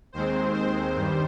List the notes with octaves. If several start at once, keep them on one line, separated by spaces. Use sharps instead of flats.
D#2 D#3 G#3 C4 C5
C5
G2 D#3 G3